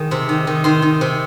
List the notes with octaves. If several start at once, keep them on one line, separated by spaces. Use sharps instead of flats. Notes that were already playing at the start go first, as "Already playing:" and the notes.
Already playing: D#3 G#3
C3
D#3
D#3
D#3 C6
D#3
C3